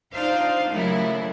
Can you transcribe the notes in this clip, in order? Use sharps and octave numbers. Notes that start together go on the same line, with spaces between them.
D4 D#4 F4 C5 F5
D#2 A2 C#3 F#3 E4